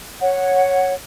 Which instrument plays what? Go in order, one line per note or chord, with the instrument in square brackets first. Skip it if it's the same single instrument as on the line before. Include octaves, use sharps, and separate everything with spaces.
[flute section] C#5 F#5